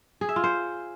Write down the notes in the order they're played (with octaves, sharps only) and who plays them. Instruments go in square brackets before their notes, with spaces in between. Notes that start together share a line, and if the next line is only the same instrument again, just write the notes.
[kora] G#4
E5
F4
C5